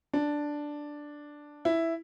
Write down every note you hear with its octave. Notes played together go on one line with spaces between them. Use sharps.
D4
E4